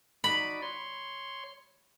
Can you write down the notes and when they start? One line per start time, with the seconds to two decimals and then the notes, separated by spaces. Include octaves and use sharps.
0.24 D#4 F#4 D5 B5
0.62 C#5 C6